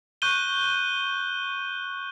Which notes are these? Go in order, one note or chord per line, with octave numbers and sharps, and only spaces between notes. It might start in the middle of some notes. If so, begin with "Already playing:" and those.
C#6 F#6 G6 D#7 G7